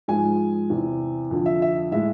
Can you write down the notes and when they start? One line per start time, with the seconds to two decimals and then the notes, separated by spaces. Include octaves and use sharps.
0.08 G#2 F3 G#3 G#5
0.70 E2 C3 E3
1.31 F2 D3 F3
1.46 E5
1.62 E5
1.92 A2 G#3 E5